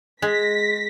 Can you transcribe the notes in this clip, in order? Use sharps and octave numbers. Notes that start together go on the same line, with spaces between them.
G#3 A#6 B6